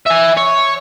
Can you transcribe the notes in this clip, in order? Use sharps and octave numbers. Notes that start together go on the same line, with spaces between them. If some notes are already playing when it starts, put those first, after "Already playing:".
E5 G#5
C#5